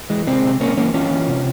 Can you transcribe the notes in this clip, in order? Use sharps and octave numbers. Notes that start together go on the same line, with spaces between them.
E3 G#3
C3 G#3 C4
C3
C3 A#3 C#4
E3 A#3 C#4
E3 C#4 F4
E3
C3